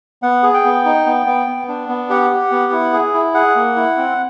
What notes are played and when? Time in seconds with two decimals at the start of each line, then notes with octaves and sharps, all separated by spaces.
0.22 B3 F#5
0.43 G#4
0.54 G5
0.64 B3
0.85 D#4
1.06 B3
1.26 B3
1.47 B3
1.68 D4
1.89 B3
2.10 G4 F#5
2.30 G4
2.51 B3
2.72 E4
2.93 G#4
3.14 E4
3.34 G#4 F#5
3.56 A#3
3.76 E4
3.97 C4